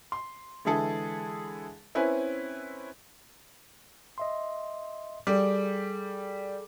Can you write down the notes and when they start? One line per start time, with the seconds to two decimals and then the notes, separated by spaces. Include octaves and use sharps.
0.12 C6
0.65 D3 E3 G#3 E4 G#4 A4
1.95 C4 C#4 E4 B4 G#5
4.18 D#5 E5 C6
5.27 G3 G#4 A4 D6